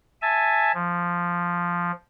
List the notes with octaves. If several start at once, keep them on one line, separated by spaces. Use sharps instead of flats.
E5 G#5 A5
F3